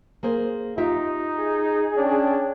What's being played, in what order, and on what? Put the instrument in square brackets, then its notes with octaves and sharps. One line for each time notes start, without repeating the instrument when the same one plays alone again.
[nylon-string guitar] A#3 G#4 C5
[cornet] D#4 [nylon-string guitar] F4 G4 E5
[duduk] G#4
[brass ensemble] C#4 G5 [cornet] D4